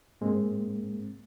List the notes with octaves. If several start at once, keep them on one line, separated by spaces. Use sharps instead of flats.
G#2 G#3 A#3 C4